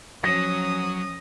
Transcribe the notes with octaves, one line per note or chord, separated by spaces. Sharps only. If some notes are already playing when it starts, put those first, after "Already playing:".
F3 F#3 C#4 D#6 A#6